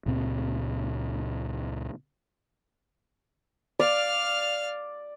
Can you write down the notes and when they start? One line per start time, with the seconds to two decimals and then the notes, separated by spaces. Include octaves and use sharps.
0.06 C#2 A#2 C4
3.79 D5 F5 F6